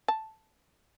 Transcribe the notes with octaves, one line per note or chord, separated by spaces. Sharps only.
A5